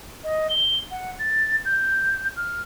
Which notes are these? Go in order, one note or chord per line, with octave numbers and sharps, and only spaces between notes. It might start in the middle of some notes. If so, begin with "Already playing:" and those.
D#5
G7
F#5
A6
G6
F6